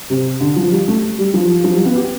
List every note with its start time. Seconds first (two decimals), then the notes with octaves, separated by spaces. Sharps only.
0.10 C3
0.40 D3
0.56 F3
0.71 G3
0.88 A3
1.19 G3
1.34 F3
1.64 F3
1.74 G3
1.85 B3
1.95 G4